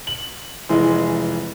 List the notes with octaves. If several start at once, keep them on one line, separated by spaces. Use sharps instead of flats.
F#7
F1 E3 G#3